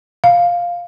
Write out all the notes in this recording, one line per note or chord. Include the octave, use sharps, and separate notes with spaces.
F5